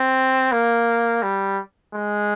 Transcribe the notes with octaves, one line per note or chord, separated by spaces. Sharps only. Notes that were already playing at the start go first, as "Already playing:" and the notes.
Already playing: C4
A#3
G3
G#3